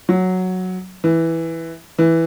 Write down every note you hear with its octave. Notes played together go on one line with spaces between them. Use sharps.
F#3
E3
E3